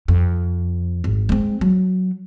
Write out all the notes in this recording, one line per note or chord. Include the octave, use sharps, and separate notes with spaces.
F2
G#1
G#3 C4
F#3